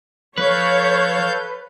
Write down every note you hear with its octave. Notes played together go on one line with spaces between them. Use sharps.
F3 A4 B4 C#5 F5 G6